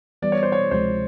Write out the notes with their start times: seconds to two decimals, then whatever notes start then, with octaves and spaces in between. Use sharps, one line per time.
0.22 E3 G3 B3 D5
0.32 C#5
0.43 C5
0.52 C#5
0.71 D2 C3 F3 G#3 C5